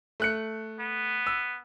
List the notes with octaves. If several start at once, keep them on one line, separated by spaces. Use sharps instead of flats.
A3 F#6 C#7
B3
E6